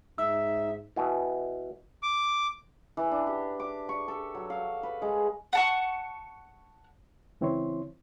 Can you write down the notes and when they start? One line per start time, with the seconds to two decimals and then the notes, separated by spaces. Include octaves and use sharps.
0.18 G#2 D#4 E5 E6
0.96 B2 E3
2.03 D6
2.97 E3
3.12 D4
3.27 G4
3.60 D6
3.89 C#6
4.08 A4
4.35 F#3
4.50 F5
4.83 B4
5.02 G#3
5.53 F#5 A5 C#6
7.41 C#2 E3 C4 E4 C#5 C6